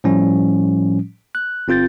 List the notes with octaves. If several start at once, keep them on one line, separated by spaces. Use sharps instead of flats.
A2 F3 G3 C#4
F#6
G1 C4 F4 G6 A6